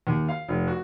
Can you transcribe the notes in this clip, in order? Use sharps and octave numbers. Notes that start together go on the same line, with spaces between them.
D#2
F5
F1
F#4